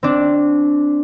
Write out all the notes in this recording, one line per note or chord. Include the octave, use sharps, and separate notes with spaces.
C4 D4